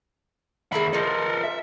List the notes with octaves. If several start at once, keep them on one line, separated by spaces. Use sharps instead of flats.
D#2 G#4 A#4 E5 B5
F3 A4 A#4 D#5
E5